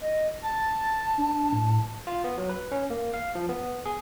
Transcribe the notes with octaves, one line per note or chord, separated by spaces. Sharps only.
D#5
A5 A6
D4
A2
F4
B3
F#3
B4
C#4
A#3
F5
F3
B3
G#4